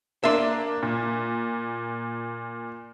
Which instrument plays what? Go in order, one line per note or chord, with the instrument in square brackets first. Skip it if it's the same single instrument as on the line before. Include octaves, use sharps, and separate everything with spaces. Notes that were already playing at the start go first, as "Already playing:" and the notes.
[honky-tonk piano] A#3 D4 [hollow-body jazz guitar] E5 C6
[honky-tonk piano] A#2